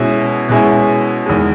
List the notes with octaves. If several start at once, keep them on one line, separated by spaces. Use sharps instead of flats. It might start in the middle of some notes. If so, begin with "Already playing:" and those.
Already playing: B2 G#3 C#4 E4
B2 G#3 C#4 E4
E2 D#3 G#3